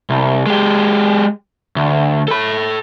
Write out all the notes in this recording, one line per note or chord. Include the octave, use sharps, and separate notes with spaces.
C2
G#3 G4
D2
A4 B5